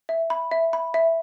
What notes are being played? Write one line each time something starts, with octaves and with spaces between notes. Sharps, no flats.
E5
B5
E5
B5
E5